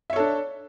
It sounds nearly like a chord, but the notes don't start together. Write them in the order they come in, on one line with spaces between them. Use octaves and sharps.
E5 C#5 A4 D4